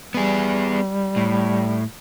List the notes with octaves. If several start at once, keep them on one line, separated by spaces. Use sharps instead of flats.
G3 B3 G#4
A2